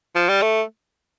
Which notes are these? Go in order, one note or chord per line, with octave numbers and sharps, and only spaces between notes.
F3
G3
A3